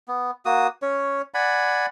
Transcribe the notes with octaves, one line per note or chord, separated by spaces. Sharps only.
B3
A#3 F#4 D#6
C#4 C#5
D5 F#5 G#5 B5